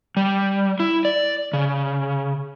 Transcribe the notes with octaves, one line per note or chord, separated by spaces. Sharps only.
G3
E4
D5
C#3